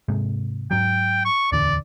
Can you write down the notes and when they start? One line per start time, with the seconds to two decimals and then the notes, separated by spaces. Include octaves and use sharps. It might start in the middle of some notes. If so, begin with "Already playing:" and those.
0.08 G#2 C3 G#3
0.71 G#2 F#3 G5
1.25 C#6
1.52 D1 E2 D3 D5